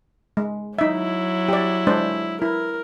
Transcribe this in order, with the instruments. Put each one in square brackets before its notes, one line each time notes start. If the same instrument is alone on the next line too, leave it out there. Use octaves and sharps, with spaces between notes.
[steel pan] G#3
[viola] F#3 E4 [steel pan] D#4 E5
[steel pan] G4 D5
G#3 D4 C5
[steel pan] E4 [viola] A#4